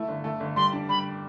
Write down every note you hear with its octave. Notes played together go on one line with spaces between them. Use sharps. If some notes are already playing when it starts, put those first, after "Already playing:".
Already playing: A3 E4
G1
A3
G1
G3 C6
D4
G3 B5